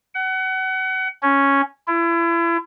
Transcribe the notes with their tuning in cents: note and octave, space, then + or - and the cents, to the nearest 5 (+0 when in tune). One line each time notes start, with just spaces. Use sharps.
F#5 +30
C#4 +0
E4 +35